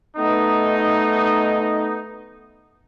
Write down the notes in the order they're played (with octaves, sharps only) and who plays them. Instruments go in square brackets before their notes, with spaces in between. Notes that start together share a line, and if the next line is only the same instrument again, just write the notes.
[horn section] A3 B3 D#4